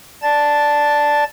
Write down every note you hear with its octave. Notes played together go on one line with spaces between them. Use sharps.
D5 A5 A6